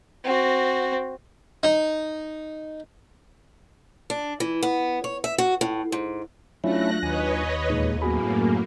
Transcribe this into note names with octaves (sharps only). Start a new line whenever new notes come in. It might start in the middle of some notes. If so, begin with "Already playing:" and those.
C4 F#4
D#4
D4
E3
B3
C#5
E5
F#4
A2
G#2
F#3 A3 C#4 D4 E4 F4 F#6 A#6
D#2 B4 C#5 D#5 G#5
E2 A#2 G#3 D#4
F#2 A2 A#3 B3 F#4 G#4 B5